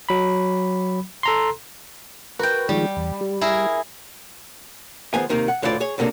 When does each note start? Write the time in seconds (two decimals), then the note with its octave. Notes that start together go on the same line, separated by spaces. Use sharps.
0.09 F#3 B5
1.23 A4 A#5 C6
2.39 F#4 A#4 B4 G5
2.69 D#3 F3 G3 G#3
2.97 E2
3.21 G3
3.41 E4 G#4 A#4
5.14 D#3 F3 B3 G#4 G#5
5.29 C3 D#3 A#3
5.48 F#5
5.62 D2 A2 E3 F4 F#4 D5
5.80 G#4 C#5
5.98 B1 C3 A#3 D4 A4